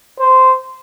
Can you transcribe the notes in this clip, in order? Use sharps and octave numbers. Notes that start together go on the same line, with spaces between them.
C5